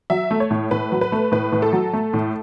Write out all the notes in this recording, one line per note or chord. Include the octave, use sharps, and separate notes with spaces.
F#3 E5
A3
C#5
A2
A2 B4
F#3
B4
A3
A2 B4
A2
A4
F#3
A3
A2